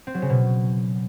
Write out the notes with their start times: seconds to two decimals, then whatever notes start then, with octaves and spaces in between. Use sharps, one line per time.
0.07 C4
0.14 F#3
0.22 C#3
0.30 B2